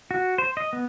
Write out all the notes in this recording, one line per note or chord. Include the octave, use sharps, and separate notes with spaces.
F#4
C5
D#5
B3